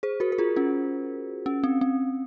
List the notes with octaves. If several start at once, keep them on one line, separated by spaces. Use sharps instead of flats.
G#4 C5
F#4 A#4
A#4
F4 G#4
C#4 F4
C#4
C4
C4